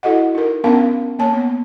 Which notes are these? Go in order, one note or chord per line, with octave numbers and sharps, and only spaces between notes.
E4 F#4 A4 D#5 F#5
D#4 A#4
B3 C#4 D4 A#4 F5 A5
A#3 C#5 A5
B3